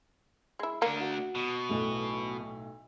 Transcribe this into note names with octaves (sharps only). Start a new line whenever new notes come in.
G#3 E4
A3 A#3 D4
F#4
B2
B1 A2